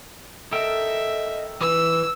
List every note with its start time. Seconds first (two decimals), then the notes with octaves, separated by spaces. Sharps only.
0.53 A4 A#4 D#5 E5 G5
1.61 E3 B4 E6